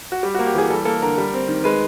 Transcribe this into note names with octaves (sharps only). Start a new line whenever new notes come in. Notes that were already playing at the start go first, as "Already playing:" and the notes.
F#4
G3 G4
A#3 F#4
G4
E3 G#4
G3 A4
A#3 A4
D3 A#4
G3
C4
D#3
G#3 B4